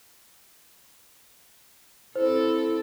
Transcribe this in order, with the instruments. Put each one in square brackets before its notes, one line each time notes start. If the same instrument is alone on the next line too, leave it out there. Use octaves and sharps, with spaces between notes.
[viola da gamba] C4 A4 [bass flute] E4 [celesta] C5